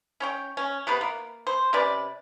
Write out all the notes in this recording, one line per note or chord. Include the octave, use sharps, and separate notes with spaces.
C#4 C#5 G5
C#4
C3 B3 B4
A#3
C5
C3 C#4 B4 D5